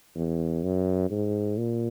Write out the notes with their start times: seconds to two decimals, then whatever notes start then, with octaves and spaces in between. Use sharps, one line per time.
0.16 E2
0.64 F#2
1.11 G#2
1.57 A#2